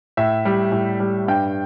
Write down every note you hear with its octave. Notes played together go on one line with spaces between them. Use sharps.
A2 E5
G3
A2
G3
G2 G5